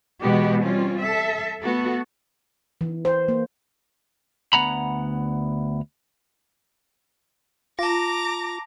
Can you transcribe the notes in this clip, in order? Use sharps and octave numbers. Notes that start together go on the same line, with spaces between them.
B2 E3 G#3 B3 F#4 G4
G3 C4 C#4 F4
A4 E5
A3 B3 F#4 A4
E3
C5
A#3
D2 B3 F#5 A#5 B5
F4 A5 A#5 D6 A#6